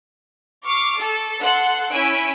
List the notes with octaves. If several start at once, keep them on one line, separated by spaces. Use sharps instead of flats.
C#6 D6 F6 C7
A4
A4 F#5 C6 F#6
C#4 E4 G#5 B5 E6 D7